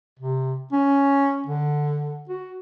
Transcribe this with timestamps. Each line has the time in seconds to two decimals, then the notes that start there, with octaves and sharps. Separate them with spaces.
0.20 C3
0.72 C#4
1.46 D3
2.29 F#4